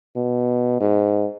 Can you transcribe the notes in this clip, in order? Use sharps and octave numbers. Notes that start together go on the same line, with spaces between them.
B2
G#2